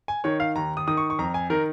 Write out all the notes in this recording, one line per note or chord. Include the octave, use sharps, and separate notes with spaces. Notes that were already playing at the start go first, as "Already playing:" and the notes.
G#5
D#3 C#5
F5
D#2 A#5
D#6
D#3 D#6
C#6
C#6
F2 A#5
G#5
D#3 A#4